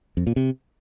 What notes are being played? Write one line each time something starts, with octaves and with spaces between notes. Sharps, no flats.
F2
A#2
C3